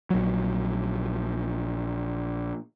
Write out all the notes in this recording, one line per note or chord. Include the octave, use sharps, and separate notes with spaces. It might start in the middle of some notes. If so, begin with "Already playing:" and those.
A#1 F#3